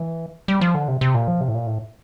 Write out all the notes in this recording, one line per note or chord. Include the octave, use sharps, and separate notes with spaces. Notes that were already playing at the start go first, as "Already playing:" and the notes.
Already playing: E3
G3
F3
D3
C3
C3
A#2
F3
C3
A2
A#2
A2